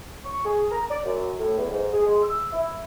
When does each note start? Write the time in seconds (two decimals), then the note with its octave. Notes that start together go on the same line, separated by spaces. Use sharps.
0.25 C#6
0.45 G#4
0.71 A#5
0.91 D5
1.06 F#2
1.39 A2
1.58 E2
1.71 G#2
1.93 G#4
2.06 G#3
2.23 E6
2.53 E4